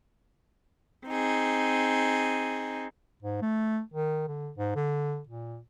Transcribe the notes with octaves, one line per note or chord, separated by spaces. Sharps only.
C4 D#4 G#4
G#2
A3
D#3
D3
G#2
D3
A#2